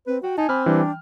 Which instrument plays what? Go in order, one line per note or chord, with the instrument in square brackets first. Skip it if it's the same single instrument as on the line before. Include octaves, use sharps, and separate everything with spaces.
[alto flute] C4 [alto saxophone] B4
[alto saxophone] F#4 [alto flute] G5
[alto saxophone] D#4 [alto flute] G#5 [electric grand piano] A5
[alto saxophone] C4 [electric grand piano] B5 D6 F6
[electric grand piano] E3 G3 [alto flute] D4
[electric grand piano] G5